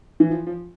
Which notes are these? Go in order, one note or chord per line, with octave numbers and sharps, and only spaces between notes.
E3
F3
F3